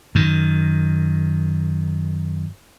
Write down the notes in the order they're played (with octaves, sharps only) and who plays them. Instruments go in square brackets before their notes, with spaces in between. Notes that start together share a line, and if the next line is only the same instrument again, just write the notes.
[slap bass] F#2 D#3